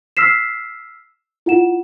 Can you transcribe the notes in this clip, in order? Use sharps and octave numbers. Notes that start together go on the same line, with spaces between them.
E6 F6 B6 C7 E7
E4 F4 F#5 E7